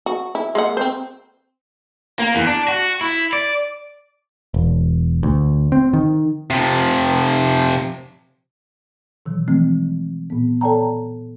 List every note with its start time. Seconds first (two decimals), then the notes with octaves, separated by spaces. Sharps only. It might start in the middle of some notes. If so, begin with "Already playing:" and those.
0.06 F#4
0.35 E4
0.55 G#3 A#3 F#5
0.77 C4 C5
2.19 A#3
2.35 E2
2.46 D4
2.68 F#4
3.01 E4
3.33 D5
4.54 E1
5.23 D2
5.72 C4
5.93 D#3
6.50 C3 F3
9.26 B2 D#3 E3 F#3
9.48 E3 F3 G#3 A3 C4
10.30 A#2 B3
10.61 A4 C#5 D5 G5 A5 A#5